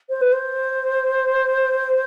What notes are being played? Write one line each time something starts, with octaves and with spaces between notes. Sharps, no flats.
C5
B4
C5